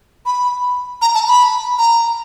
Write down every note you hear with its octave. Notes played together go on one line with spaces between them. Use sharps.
B5
A#5
A5
B5
A#5